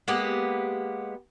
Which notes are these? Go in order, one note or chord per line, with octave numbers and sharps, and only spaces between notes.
G#3 A#3 B3 G4